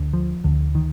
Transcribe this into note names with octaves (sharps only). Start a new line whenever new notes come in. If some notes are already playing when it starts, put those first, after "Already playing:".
Already playing: D2 D3
F3
D2 D3
D#3